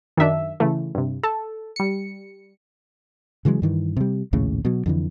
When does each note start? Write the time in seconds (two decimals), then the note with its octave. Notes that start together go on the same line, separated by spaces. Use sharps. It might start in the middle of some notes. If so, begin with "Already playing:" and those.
0.17 F#2 D#3 D4 E5
0.60 C#3 E3 A3
0.95 G2 C3
1.23 A4 A5
1.76 G3 C#7
3.45 C#3 E3 F#3 G#3
3.62 G2 D#3 E3
3.97 C3 G3
4.33 A#1 D#2 A2 C#3
4.65 B2 F#3
4.86 F2 D3 E3